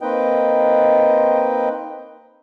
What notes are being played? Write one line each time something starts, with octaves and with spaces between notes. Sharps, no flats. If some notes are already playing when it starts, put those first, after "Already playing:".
A#3 C4 D#4 B4 D#5 G5